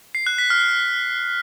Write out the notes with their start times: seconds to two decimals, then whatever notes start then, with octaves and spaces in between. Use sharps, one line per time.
0.15 C7
0.27 F#6
0.38 B6
0.50 F6